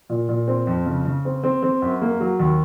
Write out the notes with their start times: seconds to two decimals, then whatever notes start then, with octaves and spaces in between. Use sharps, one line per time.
0.09 A#2
0.28 A#2
0.48 C4
0.67 F2
0.86 C#3
1.05 C#3
1.25 C4
1.44 C4
1.63 C4
1.82 F#2
2.02 A#3
2.20 F#3
2.39 D#2